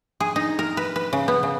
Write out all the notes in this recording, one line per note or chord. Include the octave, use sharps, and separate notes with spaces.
G#4
D#4
A#4
B4
B4
C#3
B3
C#3